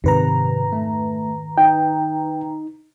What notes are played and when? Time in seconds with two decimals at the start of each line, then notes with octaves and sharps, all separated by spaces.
0.04 F2 G#2 C3 D#3 C4 B4 A#5
0.72 A3
1.58 D#4 G5